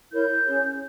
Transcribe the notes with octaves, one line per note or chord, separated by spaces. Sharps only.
E4 A#4 C#5 G6
C#4 G#4 C#5